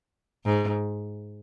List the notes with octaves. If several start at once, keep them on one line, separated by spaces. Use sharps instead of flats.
G#2